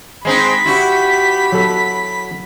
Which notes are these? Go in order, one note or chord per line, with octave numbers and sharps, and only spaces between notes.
G#3 C4 D#4 B5 B6
E4 F#4 G4
F#3 A4